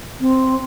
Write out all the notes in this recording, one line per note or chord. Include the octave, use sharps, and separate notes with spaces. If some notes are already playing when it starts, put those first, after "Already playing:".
C4